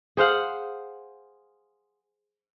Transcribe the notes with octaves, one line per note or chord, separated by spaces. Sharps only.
G#4 C5 F5 F#5